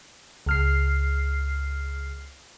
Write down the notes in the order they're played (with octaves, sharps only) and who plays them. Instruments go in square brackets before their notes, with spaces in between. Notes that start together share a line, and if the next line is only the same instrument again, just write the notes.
[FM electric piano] C#2 F6 C7